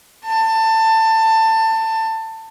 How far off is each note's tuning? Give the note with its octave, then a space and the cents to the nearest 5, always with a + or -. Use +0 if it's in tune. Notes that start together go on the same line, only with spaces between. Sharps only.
A5 +20